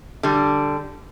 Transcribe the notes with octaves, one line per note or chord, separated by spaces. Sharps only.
D3 G3